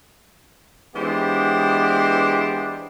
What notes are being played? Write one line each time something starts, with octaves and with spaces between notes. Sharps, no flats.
E3 G#3 B3 D4 G4 C5